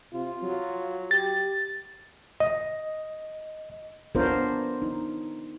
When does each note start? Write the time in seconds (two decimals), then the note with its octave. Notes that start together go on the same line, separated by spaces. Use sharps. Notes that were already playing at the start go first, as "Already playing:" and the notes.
0.13 C3 F4
0.43 F#3
1.11 G4 A6
2.40 D#5
4.15 B3 D4 F4 A#4 C5 C#5
4.82 D#4